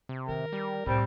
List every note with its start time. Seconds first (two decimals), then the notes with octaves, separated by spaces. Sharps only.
0.09 C3
0.28 D#3 A#4
0.52 G3
0.86 C2 A2 G3 C4